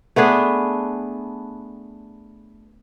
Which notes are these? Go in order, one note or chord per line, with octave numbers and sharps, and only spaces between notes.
A3 B3 D4 G#4